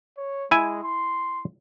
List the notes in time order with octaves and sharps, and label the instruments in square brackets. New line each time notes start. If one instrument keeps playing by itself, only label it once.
[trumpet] C#5
[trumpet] G#3 [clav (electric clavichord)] E4 G#5
[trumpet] C6